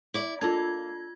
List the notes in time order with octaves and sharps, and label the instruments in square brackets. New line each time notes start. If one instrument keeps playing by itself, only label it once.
[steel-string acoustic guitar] E4 D5
[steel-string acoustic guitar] A#3 [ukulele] D4 A4 [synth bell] F4 G#6